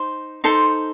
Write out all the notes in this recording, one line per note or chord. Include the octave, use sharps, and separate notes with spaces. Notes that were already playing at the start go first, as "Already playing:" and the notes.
Already playing: D#4 C5
D#4 A4 C5 C6